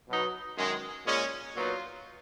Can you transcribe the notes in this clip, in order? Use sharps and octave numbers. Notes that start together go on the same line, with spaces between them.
B2 F#3 B3 D#4
F#2 D#3 G#3
A#2 G#3 C#4
A#2 F#3 B3 D#4 F4